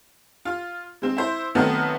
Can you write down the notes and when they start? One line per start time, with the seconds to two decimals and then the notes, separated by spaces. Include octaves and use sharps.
0.45 F4
1.02 G#3 C4
1.17 E4 C5
1.55 D#3 F#3 A3 B3 C4